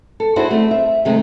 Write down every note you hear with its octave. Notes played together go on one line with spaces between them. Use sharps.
A4
D4 E4 F#4 G#4 C5
A3 C4
E5
C3 D#3 G#3 A3 C4